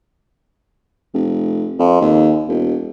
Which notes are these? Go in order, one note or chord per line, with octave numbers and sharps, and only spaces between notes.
F1
F2
D#2
E1